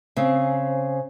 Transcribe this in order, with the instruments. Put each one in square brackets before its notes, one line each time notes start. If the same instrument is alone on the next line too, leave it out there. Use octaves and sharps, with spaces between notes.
[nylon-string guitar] C#3 C4 [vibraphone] C5 G#5